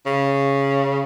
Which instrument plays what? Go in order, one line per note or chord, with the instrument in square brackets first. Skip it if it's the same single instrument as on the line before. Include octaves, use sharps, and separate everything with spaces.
[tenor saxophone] C#3